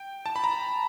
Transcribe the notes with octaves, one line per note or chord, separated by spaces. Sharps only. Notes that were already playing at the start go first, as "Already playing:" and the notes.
Already playing: G5
A5
B5
A#5